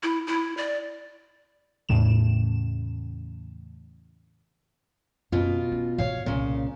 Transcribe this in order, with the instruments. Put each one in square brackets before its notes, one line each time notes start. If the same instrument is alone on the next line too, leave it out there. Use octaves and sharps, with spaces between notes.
[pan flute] E4
E4
D5
[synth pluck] E2 A2 C#3 E7
[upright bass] F#2 [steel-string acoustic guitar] B2 F4
[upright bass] C#4
[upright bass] B2 E4 [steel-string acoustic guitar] C#5 F5
[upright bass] C2 [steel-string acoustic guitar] A#2 C#3